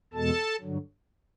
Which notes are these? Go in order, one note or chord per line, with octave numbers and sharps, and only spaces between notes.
E2 B2 G#3 A4 A5
G2 D3 F#3